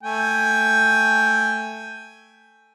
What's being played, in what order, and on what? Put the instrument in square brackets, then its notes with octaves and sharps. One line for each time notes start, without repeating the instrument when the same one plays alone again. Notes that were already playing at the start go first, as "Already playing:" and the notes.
[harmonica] A3 G5 G#5